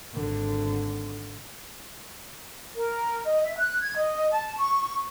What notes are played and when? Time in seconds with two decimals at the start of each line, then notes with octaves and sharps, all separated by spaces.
0.15 G#1 D3
2.75 A#4
3.23 D#5
3.42 E5
3.57 F#6
3.80 G#6
3.96 D#5
4.32 A5
4.56 C#6